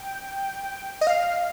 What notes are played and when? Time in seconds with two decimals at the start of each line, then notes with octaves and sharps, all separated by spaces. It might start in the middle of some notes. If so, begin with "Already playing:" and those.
Already playing: G5
1.01 D#5
1.07 F5